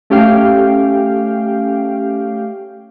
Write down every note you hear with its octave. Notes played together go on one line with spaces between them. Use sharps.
A3 C#4 G4 F5 G5